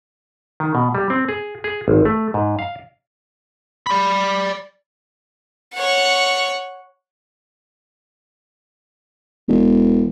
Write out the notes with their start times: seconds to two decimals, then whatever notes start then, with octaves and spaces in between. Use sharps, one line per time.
0.60 D#3
0.75 B2
0.95 G3
1.10 C4
1.29 G#4
1.64 G#4
1.88 G#1
2.05 A3
2.34 G#2
2.59 F5
3.87 D5 B5
5.74 C#5 F#5
9.48 E1